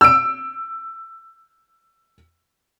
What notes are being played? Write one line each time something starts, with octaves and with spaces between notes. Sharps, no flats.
E6 D7